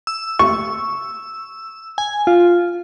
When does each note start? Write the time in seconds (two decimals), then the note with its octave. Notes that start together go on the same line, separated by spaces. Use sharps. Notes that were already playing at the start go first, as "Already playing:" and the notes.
0.07 E6
0.39 C#6
1.98 G#5
2.27 F4